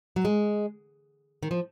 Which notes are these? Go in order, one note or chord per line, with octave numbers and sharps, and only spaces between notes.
F#3
G#3
D#3
F3